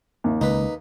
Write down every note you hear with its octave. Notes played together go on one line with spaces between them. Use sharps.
D#2
C#2 D#4 B4